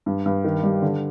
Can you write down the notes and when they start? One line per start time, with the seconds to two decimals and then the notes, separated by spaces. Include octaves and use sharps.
0.06 G2
0.26 G2
0.44 D#3
0.63 G3
0.82 D3